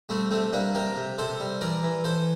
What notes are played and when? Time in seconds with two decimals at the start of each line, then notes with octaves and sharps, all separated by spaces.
0.09 G3 A3 C4
0.31 C3 A3 C4
0.53 G3 A#3 D4
0.75 C3 G4 A#4
0.96 C3
1.18 C3 A4 C5
1.40 G3
1.61 E3 A#4 D5
1.83 E3
2.04 E3 A4 C5